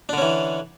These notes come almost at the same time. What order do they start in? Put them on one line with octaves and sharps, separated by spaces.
D4 D3 C#4 E3